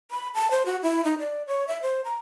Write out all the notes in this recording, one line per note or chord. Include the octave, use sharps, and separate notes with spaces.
B5
A5
C5
F#4
E4
D#4
D5
C#5
E5
C5
A#5